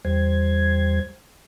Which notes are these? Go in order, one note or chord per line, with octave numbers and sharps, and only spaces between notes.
E2 G3 C5 G#6